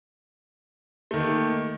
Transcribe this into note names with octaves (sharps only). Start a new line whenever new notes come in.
D#3 A3 A#3